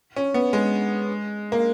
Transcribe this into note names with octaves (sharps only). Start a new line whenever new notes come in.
C#4
B3
G#3
A#3